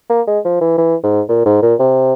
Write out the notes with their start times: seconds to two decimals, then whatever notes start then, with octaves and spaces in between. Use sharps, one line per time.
0.10 A#3
0.27 G#3
0.45 F3
0.61 E3
0.78 E3
1.03 G#2
1.29 A#2
1.46 G#2
1.62 A#2
1.79 C3